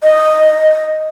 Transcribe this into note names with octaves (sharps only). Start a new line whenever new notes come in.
D#5